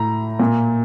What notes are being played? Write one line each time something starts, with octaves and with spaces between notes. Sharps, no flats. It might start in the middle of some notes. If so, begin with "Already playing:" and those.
Already playing: A2 A#5
A#2